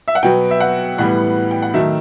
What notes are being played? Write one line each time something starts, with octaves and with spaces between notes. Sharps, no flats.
E5
F#5
B2 F#3 B3 G5
E5
F#5
A2 E3 G3 B3 F#5
G5
F#5
D#3 F#3 A3 E5